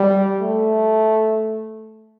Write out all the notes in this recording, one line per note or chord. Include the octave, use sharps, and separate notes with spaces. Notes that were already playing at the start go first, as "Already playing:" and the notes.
Already playing: G3
A3